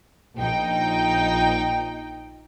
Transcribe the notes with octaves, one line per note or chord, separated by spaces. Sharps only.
A#1 D#4 G5